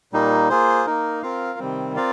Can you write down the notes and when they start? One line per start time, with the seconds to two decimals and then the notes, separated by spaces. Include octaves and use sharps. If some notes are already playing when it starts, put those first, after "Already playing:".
0.13 A#2 G3 A#3 D#4
0.49 A#3 F4 G#4 C5
0.86 A#3 D#4 A#4
1.23 C4 F4 A#4 F5
1.59 C3 D#3 G3 C4
1.96 C4 F4 A#4 D5 F5